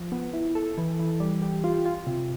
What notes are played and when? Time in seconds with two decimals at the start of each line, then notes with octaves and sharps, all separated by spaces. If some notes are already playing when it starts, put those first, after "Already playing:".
Already playing: F3
0.12 B3
0.33 E4
0.55 A4
0.78 E3
0.99 E3
1.20 G3
1.42 G4
1.64 F4
1.86 F4
2.07 C3